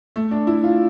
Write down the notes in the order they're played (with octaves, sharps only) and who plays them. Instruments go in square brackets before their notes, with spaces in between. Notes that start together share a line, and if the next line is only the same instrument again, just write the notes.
[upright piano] A3
D4
E4
F4